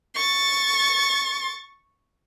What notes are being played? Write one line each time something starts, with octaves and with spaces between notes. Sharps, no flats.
C#6 A6